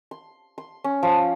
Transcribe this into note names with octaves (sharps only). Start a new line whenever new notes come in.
C6
C6
C#4
F3